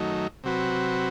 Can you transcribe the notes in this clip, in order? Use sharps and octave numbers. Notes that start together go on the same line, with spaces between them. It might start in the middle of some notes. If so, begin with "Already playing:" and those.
Already playing: F#2 D#3 F#3 A3 D#4
C3 F#3 C4 F#4 B4